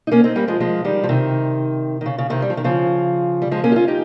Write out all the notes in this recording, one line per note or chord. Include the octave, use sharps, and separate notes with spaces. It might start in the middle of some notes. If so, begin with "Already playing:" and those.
D#4
A#3 C#4
C4 D#4
G3 A#3
F3 G#3
F3 G#3
D#3 G3
F3
C3 D#3
D#3
C#3
C#3
C3 D#3
G3
F3
D#3
C#3 F3
G3
F3 G#3
A#3 C#4
G4
C#4 F4
D#4 G4